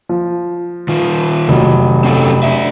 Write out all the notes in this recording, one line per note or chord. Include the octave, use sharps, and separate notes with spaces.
F3
D#3 F4
F1 F#3
C4 C#4 A4
D4 E5